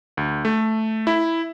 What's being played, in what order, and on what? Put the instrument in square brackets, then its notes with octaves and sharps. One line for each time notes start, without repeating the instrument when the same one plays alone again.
[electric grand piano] D2
A3
E4